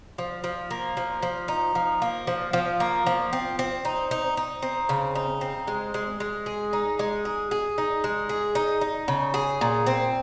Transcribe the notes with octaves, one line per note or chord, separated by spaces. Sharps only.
F3
F3
A#3
F3
F3
D#4
F3
A#3
F3
F3
A#3
F3
C4
C4
D#4
D#4
D#4
C4
C#3
D#4
C4
G#3
G#3
G#3
G#4
D#4
G#3
G#4
G#4
D#4
G#3
G#4
D#4
D#4
C#3
G#4
A#2
C4